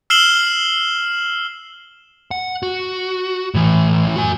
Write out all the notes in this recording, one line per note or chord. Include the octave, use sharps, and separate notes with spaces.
E6 F6 C7 E7 F#7 G7
F#5
F#4
A2 E3
F#4 G#5